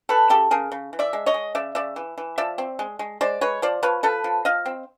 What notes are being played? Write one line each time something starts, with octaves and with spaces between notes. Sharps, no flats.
E3 A4 B4
C#3 G4 A4
C#3 G#4 A#4
C#3
E3
D5 E5
G#3
C#5 D#5
G#3
C#3 D5 E5
C#3 D5 E5
E3
E3
F3 D5 E5
C4
G#3
G#3
G#3 C5 D5
G#3 B4 C#5
F3 C5 D5
F3 B4 C#5
F3 A4 B4
F3
F3 D#5 F5
C4